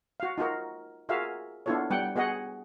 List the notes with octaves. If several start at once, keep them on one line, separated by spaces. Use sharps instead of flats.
F#4 F5
D#4 F4 F#4 A#4
F4 F#4 G#4 A#4 E5 F5
B3 D4 E4 F4 A4 C#5
G3 B3 F#5 G5
B3 F#4 G#4 D#5 F#5